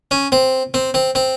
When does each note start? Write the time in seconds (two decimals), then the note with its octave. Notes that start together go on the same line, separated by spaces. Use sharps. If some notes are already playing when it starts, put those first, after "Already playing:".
0.11 C#4
0.32 C4
0.74 C4
0.94 C4
1.15 C4